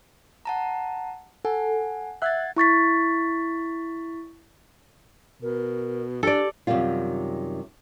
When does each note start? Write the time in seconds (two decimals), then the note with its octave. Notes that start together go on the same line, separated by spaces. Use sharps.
0.45 F#5 A5 A#5
1.45 A4 F#5 G#5
2.22 E5 F#5 F#6 G#6 A6
2.57 E4 C#6 A6 B6
5.42 B2 A#4
6.23 D4 G4 A4 D5
6.67 F#2 C3 D#3 G3 F4